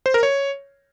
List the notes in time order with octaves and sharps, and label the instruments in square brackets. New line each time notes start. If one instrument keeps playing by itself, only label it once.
[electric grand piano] C5
A#4
C#5